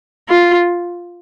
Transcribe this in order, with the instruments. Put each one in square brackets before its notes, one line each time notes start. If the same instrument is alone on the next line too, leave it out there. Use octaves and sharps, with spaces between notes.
[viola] F4